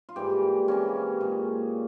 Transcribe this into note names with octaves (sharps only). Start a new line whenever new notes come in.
F4
G#2 E3 G3 A#3 G4
C3 E3 A#3 C#4
A#2 G#3